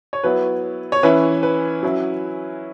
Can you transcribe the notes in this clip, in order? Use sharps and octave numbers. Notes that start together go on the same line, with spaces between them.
C#5
F#3 B3 E4 B4
C#5
E3 C#4 E4 B4
B4
F#3 C#4 E4